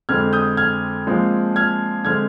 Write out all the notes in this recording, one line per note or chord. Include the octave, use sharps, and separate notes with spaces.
F2 D3 G#3 C4 F6 G#6
D#6 G6
F6 G#6
A#2 F3 G#3 C4
F6 G#6
D3 G#3 C4 F6 G#6